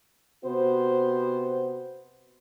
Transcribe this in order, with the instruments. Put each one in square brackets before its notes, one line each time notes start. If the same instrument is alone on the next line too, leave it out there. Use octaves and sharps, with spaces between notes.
[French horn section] C3 B3 F#4 C5